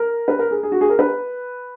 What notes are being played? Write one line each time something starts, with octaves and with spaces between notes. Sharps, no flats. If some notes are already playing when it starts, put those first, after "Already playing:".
Already playing: A#4
B4
A#4
G#4
G#4
F#4
G#4
A#4
B4